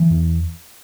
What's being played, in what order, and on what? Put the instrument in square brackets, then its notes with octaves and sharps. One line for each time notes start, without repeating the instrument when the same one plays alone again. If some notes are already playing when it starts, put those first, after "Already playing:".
Already playing: [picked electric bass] E3
E2